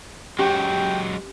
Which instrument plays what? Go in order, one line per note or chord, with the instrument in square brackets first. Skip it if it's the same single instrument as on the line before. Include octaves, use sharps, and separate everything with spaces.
[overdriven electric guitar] F#3 G#3 [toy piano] C#4 G4 D6 [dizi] G5